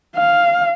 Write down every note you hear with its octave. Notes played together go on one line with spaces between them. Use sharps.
F5